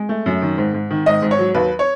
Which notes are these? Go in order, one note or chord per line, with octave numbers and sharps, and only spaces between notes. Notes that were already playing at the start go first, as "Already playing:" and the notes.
Already playing: G#3
A3
F#2
D#3
G#2
G#2
D#3
G#2 D#5
G#2
C#5
F#3
D#2 B4
C#5